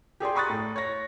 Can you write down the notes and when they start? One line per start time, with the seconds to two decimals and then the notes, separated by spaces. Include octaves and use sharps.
0.20 G4 G#4 D5 C6
0.35 A#5 B5 C#6 D#6 F#6 A6
0.49 A2
0.76 C#5 A#6